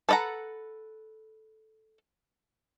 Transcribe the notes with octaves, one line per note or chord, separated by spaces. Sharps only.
A4 B4 D#5 F#5 A#5